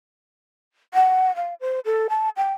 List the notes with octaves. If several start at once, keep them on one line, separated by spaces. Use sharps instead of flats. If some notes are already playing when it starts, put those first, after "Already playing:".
F#5
F5
C5
A4
A5
G5